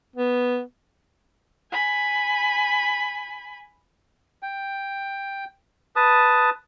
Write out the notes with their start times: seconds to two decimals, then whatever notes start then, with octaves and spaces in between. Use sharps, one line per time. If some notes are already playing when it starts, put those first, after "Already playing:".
0.16 B3
1.72 G#5 B5
4.42 G5
5.96 B4 A5 D#6